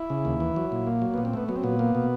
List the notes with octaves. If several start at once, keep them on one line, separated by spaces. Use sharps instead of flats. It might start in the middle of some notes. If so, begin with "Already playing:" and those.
Already playing: E4
C#3
D#2
E3
F#3
A#2
A#3
F#3
A#2 B3
C4
A3 B3
F#3 B3
C4
A#2 B3
A#3
B2